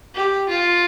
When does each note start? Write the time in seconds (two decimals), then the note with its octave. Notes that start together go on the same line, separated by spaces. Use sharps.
0.15 G4
0.49 F4